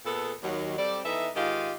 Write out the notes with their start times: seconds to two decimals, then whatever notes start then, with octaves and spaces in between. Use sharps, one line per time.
0.05 A#2 B3 G#4 A4
0.43 D#2 D#3 F#3
0.78 G3 C4 A4 D5
1.05 E3 B3 D#4 A4 E5
1.35 G#2 D#3 F4 G4 D#5 F5